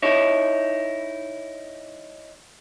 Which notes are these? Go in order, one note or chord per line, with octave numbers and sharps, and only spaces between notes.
D#4 E4 C#5